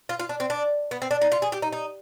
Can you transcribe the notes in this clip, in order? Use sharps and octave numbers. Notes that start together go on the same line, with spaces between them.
F4
F4
D4
C4
D4
B3
C4
D4
D#4
F4
G#4
G4
D#4
D#4